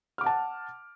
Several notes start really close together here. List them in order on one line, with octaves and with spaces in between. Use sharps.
F6 D6 F#5 A5